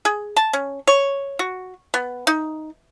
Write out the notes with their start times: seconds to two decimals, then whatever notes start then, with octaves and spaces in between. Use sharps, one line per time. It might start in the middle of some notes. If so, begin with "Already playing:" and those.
0.05 G#4
0.36 A5
0.53 C#4
0.87 C#5
1.39 F#4
1.94 B3
2.27 D#4